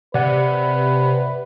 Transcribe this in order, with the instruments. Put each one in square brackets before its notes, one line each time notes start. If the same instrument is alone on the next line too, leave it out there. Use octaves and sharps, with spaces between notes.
[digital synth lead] C3 [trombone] B4 [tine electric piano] D5 F#5